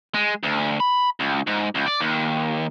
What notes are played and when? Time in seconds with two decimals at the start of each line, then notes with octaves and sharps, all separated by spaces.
0.14 G#3
0.43 D2
0.80 B5
1.20 C#2
1.47 G#2
1.75 C#2
1.86 D5
2.00 D#2